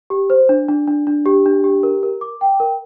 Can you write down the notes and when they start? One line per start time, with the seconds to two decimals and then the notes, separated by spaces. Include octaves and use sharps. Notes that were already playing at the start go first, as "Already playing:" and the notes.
0.10 G4
0.30 C5
0.49 D4
0.69 D4
0.88 D4
1.07 D4
1.26 G4
1.46 D4
1.64 G4
1.83 A#4
2.03 A#4
2.21 D6
2.41 G5
2.60 A#4